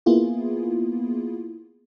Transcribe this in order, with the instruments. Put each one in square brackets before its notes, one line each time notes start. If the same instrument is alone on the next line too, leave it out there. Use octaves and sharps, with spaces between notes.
[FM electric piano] A#3 B3 E4 F4 G#4